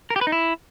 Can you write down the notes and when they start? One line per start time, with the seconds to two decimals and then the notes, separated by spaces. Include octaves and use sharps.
0.10 A#4
0.16 G4
0.21 B4
0.27 D#4
0.32 E4